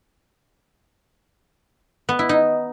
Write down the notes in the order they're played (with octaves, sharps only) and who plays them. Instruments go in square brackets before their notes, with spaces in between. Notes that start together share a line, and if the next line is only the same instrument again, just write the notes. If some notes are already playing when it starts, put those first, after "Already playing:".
[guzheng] B3
E4
D#4